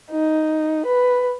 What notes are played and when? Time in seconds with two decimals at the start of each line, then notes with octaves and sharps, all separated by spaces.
0.11 D#4
0.85 B4